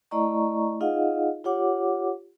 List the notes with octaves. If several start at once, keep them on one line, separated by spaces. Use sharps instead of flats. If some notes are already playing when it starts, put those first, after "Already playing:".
A3 E4 D5 D#5 A#5 C#6
D#4 F4 G#4 D#5 F5 F#5
F4 G4 C#5 F#5 D6